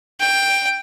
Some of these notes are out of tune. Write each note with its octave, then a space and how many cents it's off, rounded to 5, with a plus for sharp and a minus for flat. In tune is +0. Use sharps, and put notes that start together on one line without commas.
G5 +10